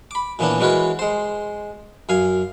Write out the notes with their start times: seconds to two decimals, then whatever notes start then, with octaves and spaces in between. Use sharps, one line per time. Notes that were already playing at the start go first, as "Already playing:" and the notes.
0.11 B5 D6
0.39 A#2 E3 B3 C#4 D4
0.60 E3 G#3 F#4 A#4 B4 C#5
0.99 G#3 C5
2.09 F#2 F5 G#5